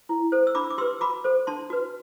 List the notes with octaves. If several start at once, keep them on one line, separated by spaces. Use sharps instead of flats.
E4
A4 C5
E6
D4 B5 D6
D6
G4 B4 C6 E6
F#4 B5 D6
A4 C5
D4 A5 C6
F#4 B4